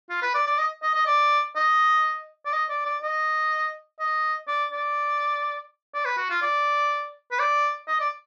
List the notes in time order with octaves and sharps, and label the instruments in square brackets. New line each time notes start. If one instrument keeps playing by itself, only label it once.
[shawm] F4
B4
D5
D5
D#5
D#5
D#5
D5
D#5
D5
D#5
D5
D5
D#5
D#5
D5
D5
D5
B4
F#4
F4
D5
B4
D5
D#5
D5